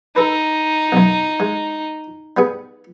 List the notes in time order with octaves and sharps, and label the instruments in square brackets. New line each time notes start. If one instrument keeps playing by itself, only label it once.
[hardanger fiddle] D#4 [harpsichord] A4 B4
[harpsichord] B1 F#2
G#3
G3 B3 G#4